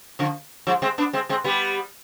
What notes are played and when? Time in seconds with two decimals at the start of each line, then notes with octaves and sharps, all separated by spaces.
0.19 D3 F3
0.67 F3 G#3
0.82 G#3 C4
0.98 B3 D4
1.13 G#3 C4
1.29 G#3 C4
1.44 G3 B3